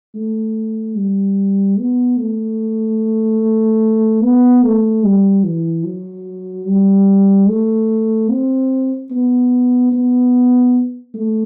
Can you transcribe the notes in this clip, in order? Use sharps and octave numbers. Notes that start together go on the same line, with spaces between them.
A3
G3
B3
A3
B3
A3
G3
E3
F#3
G3
A3
C4
B3
B3
A3